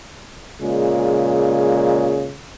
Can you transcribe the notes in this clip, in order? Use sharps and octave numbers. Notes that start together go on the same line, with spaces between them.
A#2 C#3 G#3